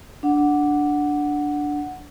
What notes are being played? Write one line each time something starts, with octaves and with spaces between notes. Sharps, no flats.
D4 F#5